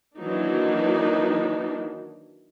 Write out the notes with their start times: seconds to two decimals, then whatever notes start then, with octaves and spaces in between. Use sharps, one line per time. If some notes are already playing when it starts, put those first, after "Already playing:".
0.16 D#3 E3 F#3 A#3 D4 D#4